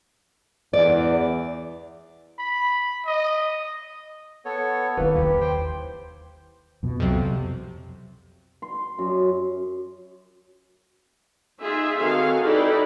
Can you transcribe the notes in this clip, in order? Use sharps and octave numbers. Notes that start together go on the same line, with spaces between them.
E2 D5
B5
D#5
B3 A4 C#5
D#3 A#3 E4 B4
D#2 D3 G4
C5 G5
F2 B2
C2 F2 C3 F3 F#3
C6
F#2
D#4 F4 G#4 E5
D#3 C4 F#4 G#4 A4 F5
D#4 E4 G4 A4 B4 D5